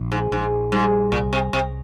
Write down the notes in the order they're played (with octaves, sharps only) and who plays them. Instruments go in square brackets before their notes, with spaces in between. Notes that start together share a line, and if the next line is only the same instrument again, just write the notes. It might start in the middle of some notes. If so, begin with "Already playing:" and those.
Already playing: [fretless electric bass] A#1
[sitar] G#2
[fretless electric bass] A#1 [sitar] G#2
[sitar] G#2 [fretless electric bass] G3
[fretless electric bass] C2 [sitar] A#2
[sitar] C3
[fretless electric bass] C2 [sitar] C3